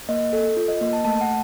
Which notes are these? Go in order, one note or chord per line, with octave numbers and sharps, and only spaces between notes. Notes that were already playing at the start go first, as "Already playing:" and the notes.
A#3 D#5
A4
F4
D#5
A#3 D#5
A5
A3 A5
F#5